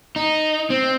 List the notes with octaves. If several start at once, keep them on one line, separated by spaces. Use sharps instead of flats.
D#4
C4